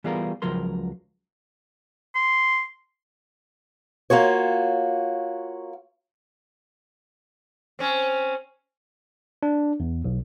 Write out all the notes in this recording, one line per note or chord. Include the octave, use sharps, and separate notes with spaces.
E3 G3 B3 F4 G#4 A#4
C#2 F3 F#3 A#4 C6
C6
A#3 F4 F#4 C#5
C4 C#4
D4
E2
B1